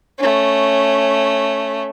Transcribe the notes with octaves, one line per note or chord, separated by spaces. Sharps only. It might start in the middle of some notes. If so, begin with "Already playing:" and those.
A3 C#4